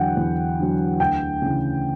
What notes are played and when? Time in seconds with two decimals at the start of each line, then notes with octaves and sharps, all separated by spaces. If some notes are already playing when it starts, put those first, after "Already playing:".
Already playing: E2 D3 F#3 F#5 G5
0.17 E2
0.59 D3 F#3
1.00 D2 G5
1.42 C#3 E3